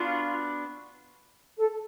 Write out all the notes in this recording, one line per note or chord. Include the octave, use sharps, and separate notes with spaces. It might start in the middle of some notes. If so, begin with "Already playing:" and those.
Already playing: B3 D4 F4 F#4
A4